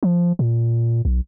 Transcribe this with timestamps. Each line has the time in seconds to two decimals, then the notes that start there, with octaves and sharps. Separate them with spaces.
0.03 F3
0.39 A#2
1.05 B1